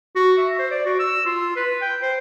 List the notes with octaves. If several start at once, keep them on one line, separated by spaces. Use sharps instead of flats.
F#4
E5
C5
D5
F#4
E6
F4
B4
G5
C5